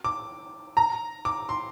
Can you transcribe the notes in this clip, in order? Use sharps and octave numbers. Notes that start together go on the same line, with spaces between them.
D6
A#5
D6
C6